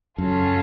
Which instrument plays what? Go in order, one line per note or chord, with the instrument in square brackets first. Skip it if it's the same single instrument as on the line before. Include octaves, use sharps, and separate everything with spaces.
[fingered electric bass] F#2 [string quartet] C#3 F#3 C#4 F4 A4